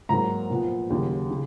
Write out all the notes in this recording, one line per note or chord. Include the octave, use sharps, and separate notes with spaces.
G#2 F#3 A#3 A#5
A#2 F3 B3
D#2 C#3 F#3
C#3